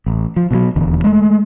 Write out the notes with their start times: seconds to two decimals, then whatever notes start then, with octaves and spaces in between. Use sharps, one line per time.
0.06 A1
0.36 F3
0.51 B2 F3 F#3
0.76 D#1 E2 D3
1.04 G#3 A3